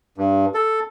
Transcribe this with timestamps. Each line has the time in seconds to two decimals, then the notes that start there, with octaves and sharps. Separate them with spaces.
0.18 G2
0.54 A4